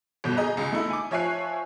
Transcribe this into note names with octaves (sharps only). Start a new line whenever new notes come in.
G1 B2 G6
G#4 D#5 A#5
C#2
A3 D#4 E4
G#5 D6
F3 C#5 E5 G#5 F#6 C7